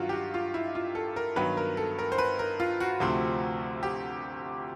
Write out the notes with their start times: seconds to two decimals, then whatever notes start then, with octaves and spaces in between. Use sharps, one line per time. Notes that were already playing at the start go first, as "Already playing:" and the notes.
Already playing: G2 D#3 F#3 F4 F#4
0.09 G4
0.12 F#4
0.34 F4
0.54 E4
0.75 F4
0.95 A4
1.16 A#4
1.36 G2 D#3 F#3 B3 B4
1.57 A#4
1.77 A4
1.99 A#4
2.12 C5
2.18 B4
2.39 A#4
2.60 F4
2.80 F#4
3.00 D2 C3 F3 A3 C4
3.83 G4